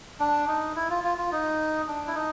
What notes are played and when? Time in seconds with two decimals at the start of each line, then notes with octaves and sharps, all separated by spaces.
0.20 D4
0.48 D#4
0.76 E4
0.90 F4
1.04 F4
1.18 F4
1.32 D#4
1.88 D4
2.07 E4
2.15 D#4